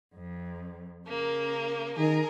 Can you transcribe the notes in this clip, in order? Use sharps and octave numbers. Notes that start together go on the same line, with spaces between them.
F2
C#3 A#3 A#4
D#3 G#4 A#4 A#5